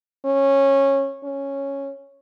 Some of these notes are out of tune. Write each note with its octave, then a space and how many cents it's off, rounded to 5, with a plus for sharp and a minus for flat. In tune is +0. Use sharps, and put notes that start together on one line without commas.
C#4 -15
C#4 -5